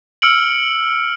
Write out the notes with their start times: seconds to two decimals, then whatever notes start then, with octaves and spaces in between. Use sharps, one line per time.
0.22 E6 F6 C#7 D7 F#7